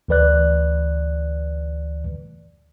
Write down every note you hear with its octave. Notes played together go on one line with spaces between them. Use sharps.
D2 E3 B4 D5 F#6